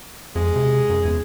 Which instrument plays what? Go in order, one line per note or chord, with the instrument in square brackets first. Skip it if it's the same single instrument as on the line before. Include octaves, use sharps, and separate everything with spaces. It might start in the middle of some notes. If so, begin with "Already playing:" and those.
[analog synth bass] F2 [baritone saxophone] G#3
[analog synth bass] C3
F#2
E2